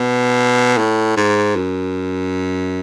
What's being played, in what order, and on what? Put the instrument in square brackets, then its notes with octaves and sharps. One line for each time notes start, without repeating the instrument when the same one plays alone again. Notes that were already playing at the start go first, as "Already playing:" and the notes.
Already playing: [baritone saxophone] B2
A2
G#2
F#2